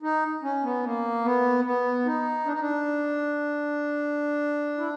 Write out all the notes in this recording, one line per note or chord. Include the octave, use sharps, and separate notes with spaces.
D#4
C#4
B3
A#3
B3
B3
D#4
D4
D#4
D4
E4